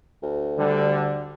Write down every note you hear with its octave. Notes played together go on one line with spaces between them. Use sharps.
D2
D3 G3